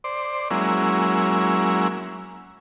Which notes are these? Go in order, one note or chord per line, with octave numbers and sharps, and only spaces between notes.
C5 D5
F#3 G#3 A#3 C#4 E4